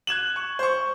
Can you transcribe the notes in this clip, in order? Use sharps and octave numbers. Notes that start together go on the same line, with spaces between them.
F#6 G#6 E7 F#7
C#6
C5 C#6